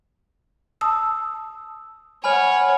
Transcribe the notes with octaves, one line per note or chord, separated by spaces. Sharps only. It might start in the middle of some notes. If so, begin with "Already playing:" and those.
A5 D#6 E6
C#5 F#5 G#5 B5 F6